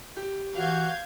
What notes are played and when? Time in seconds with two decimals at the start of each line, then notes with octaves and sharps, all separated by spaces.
0.17 G4
0.56 E3 F#4 F5 G6 G#6